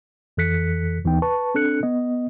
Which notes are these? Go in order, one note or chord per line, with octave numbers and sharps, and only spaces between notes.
F2 E3 A4 F#6 B6 C#7
D#2 E3 B3 D#4 G5
B4 A5 C#6
C4 D4 A4 F#6 C#7
B3 D#5